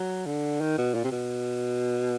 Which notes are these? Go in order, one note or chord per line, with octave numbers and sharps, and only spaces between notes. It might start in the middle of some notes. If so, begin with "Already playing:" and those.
Already playing: F#3
D3
D#3
B2
A#2
C3
B2